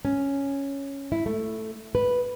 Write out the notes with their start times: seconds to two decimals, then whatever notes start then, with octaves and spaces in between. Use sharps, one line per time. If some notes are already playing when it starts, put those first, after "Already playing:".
0.05 C#4
1.12 E4
1.26 A3
1.95 B4